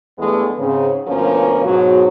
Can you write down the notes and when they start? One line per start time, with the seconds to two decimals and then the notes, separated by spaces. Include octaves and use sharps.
0.18 E2 G2 E3 G#3 A3 B3
0.58 G#2 C#3 C4
1.07 D2 B2 F3 A#3 C#4 A#4
1.64 G#2 B2 F#3